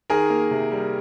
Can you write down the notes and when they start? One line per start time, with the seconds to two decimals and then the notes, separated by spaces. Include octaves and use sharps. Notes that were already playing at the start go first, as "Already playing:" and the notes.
0.10 D#3 G#4 A#4
0.30 A#3
0.51 C3
0.72 G3